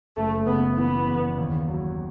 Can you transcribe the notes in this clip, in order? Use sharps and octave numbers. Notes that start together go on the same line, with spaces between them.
F#1 A3
C#3 B3
E3 B3
E2
D#2
F#3